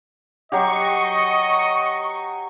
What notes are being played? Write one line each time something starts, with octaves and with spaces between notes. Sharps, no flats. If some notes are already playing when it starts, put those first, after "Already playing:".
F#3 F#4 G4 D#5 C#6